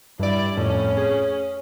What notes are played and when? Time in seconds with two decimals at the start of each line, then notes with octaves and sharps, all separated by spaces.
0.20 G2 E4 D5
0.57 F2 A2 C#4
0.97 G#4